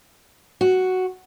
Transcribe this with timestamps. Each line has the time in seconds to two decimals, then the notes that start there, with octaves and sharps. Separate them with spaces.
0.61 F#4